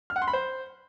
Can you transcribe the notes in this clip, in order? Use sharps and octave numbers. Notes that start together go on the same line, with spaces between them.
F6
F#5
C6
B5
C5